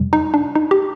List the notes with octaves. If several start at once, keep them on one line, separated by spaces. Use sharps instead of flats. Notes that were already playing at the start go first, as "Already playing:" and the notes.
Already playing: F2 C3 G3
D#4
D4
D#4
G4